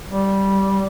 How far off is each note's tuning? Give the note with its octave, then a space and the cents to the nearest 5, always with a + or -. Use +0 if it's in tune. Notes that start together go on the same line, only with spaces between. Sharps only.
G3 -10